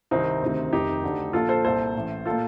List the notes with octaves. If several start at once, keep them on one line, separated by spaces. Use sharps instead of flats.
C2 C3 D#3 C4 D#4
D2 C3 D#3
F1 F2 C3 D#3 D#4 G4
D2 D3
A#1 A#2 F4 A4
A4 C5
C2 A#2 A4 C5
A1 A2
A#2 F4 A4